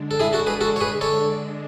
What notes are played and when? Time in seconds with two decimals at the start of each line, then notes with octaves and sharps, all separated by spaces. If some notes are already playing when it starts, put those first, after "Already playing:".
Already playing: D3 G#3 D4
0.11 A4
0.20 E4 G#4
0.33 F#4 A4
0.47 G#4 B4
0.61 F#4 A4
0.76 C#5
0.80 G#4 B4
1.01 A4 C#5